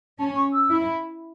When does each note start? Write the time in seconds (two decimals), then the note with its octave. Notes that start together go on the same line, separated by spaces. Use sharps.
0.19 C#4 A5
0.36 C#6
0.53 E6
0.71 E4